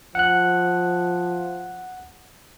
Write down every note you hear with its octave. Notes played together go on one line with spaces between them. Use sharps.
F3 F#5 F#6